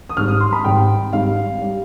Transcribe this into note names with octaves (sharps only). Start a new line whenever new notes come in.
D#6
G#1 G#2 G3 F6
D#6
C6
B5
G#1 G#2 G3 G5
G#1 G#2 G3 F5
G3